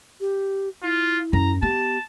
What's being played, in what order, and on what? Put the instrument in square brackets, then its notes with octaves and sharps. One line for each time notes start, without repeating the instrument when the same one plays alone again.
[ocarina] G4
[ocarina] E4 [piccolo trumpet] F4
[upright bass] F#2 [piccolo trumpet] A#5
[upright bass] B3 [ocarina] G4 [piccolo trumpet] A5